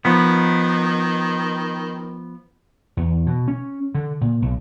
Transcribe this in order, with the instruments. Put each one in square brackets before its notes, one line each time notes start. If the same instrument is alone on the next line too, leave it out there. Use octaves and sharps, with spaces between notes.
[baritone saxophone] D#3 [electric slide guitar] F3 B3
[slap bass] E2
B2
C#4
D3
A#2
B1